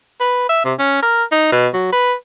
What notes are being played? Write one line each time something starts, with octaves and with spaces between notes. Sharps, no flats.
B4
E5
C3
C#4
A#4
D#4
B2
F#3
B4